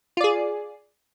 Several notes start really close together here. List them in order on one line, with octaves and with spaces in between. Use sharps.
F4 D5 G#4